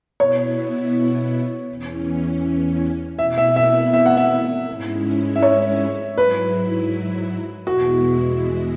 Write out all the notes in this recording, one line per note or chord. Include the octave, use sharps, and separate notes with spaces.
B2 B3 E4 C#5
E2 E3 C#4
B2 B3 E4 E5
E5
E5
E5
F#5
E5
G#2 G#3 C#4 E4
E5
C#5
G#2 F#3 E4 B4
E2 B2 G#3 E4 F#4